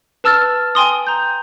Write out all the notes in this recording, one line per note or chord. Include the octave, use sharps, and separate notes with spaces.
B4 A5 E6 F6 A6
G5 G#5 C6 D#6
A#5 G6